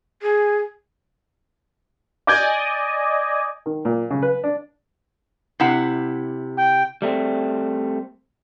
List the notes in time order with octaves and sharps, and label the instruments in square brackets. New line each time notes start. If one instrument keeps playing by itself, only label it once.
[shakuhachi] G#4
[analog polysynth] D5 D#5 G#5 [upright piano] D6 G6 G#6
[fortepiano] D#3
A#2
C#3
B4
D4
[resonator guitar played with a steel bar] C3 E4 F#5
[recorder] G5
[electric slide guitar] G3 A3 C4